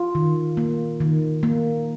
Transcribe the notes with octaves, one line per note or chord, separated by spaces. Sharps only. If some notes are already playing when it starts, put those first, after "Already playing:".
Already playing: F4
D#3
A#3
D#3
A#3